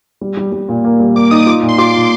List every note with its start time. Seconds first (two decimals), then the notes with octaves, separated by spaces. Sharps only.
0.21 G3
0.37 G3
0.52 G3
0.69 A#2
0.84 A#3
1.00 G3
1.16 A#3 D6
1.31 D#4 D#6
1.46 F4 D6
1.62 A#2
1.69 C6
1.78 F4 D6
1.95 A#2